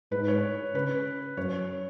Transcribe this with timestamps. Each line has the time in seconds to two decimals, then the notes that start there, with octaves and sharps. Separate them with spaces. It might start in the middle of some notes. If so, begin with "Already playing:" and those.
0.12 G#2 B4
0.28 C#5
0.75 C#3 B4
1.37 F#2 C#5